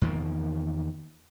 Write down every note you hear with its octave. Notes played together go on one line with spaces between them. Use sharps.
E2 D#3 F3 A#3